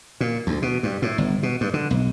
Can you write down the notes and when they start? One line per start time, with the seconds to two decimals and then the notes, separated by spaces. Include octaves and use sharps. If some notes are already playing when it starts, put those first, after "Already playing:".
0.20 A#2
0.47 D2
0.62 B2
0.83 G2
1.02 A2
1.18 G1
1.43 B2
1.61 G2
1.74 D3
1.91 B1